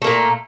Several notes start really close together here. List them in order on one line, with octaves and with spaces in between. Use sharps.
A3 A#3 A#2